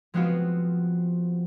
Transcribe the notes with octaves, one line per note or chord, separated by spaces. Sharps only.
F3 G#3 B3 C4 F4 F#4